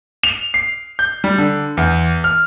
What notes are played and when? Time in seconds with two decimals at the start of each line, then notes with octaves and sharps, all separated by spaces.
0.23 F7
0.54 C7
0.99 G6
1.24 G3
1.38 D3
1.77 E2
2.24 F6